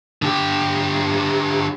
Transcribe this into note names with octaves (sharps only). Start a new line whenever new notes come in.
D3 G4